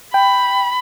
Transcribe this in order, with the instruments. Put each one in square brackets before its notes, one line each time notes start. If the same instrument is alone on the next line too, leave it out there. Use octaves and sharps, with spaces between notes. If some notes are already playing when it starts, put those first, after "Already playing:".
[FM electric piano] G5 [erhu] B5